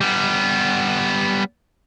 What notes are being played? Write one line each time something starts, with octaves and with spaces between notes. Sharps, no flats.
G3 B3